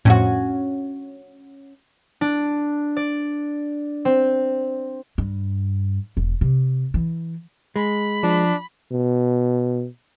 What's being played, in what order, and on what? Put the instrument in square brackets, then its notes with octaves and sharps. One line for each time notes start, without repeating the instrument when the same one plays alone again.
[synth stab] F2 A2 [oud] C#4 F#4
[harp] D4
D5
C4
[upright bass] G2
E1
C3
E3
[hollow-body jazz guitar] G#3 [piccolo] B5
[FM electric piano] F3 [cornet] D4
[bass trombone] B2